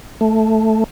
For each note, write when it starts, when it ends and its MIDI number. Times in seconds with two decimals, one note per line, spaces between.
0.21 0.84 57